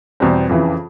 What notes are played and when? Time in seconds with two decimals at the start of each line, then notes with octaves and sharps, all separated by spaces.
0.20 E2 B2 G3 C4
0.49 F2 C#3 E3